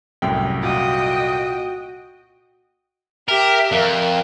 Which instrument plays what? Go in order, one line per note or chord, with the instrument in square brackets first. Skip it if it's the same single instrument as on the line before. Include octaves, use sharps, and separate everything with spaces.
[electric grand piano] C2 F#2 A2 [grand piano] G5
[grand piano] A#2 [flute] F#4 [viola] D#5 G5
[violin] G4 E5 [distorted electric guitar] A#4
[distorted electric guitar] F2 [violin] A#4